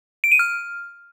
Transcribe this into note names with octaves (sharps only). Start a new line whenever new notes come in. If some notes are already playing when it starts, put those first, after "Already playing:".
D7
D#7
F6